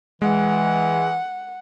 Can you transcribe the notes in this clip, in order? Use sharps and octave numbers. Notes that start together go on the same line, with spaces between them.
E3 G#3 F#5